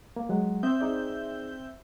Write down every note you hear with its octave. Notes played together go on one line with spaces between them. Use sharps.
A#3
F#3 G#3 F#5
C4 C5 E5 D#6 G6
D#4 G#4 D5